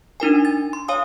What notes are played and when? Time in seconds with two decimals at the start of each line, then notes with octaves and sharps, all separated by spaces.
0.20 D4 D#4 A#4 G#5
0.45 A6
0.73 C6
0.88 C#5 F5 G#5 D#6